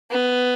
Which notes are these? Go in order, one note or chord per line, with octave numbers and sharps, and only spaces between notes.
B3